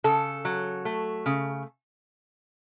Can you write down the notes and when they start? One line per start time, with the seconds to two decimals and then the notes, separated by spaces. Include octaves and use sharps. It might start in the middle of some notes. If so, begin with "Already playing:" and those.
0.04 C#3 A4
0.45 F#3
0.85 A3
1.26 C#3